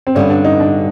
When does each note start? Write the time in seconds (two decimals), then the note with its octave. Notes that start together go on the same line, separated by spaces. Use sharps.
0.07 C4
0.15 G2 D3 G3 B3 C#4
0.30 D4
0.45 D#4
0.60 D4